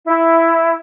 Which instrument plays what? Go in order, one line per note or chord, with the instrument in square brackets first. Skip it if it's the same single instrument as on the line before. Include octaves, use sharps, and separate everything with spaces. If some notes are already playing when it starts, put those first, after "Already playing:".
[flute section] E4